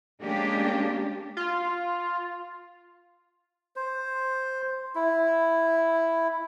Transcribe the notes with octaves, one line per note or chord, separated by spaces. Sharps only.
G#3 A#3 C#4 D4 G4
F4
C5
E4